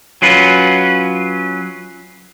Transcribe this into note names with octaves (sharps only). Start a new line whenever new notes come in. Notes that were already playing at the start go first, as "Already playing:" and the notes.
F#3 C#4 F4 B4